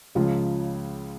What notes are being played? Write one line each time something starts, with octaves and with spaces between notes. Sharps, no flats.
C#2 C#3 F3 F4